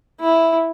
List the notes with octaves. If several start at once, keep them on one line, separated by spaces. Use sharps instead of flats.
E4